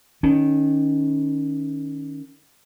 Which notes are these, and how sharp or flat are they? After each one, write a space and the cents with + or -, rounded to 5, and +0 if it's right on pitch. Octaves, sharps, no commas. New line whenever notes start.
D#3 +0 C#4 +15